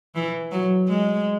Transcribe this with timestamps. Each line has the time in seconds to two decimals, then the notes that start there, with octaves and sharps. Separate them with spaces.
0.15 E3
0.52 F#3
0.88 G#3